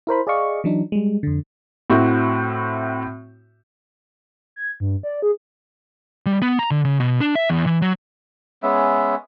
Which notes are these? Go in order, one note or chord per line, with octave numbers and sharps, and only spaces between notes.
E4 A#4 C5 B5
G#4 D5 D#5 F5 C#6
E3 F#3 D4 D#4
G3 G#3
F2 D3
A2 C4 E4 F#4
G#6
G2
D5
G#4
G3
B3
A#5
D3
C#3
B2
D4
E5
E2
E3
F#3
G#3 B3 C#4 E5